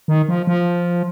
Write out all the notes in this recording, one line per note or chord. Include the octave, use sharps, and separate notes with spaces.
D#3
F3
F3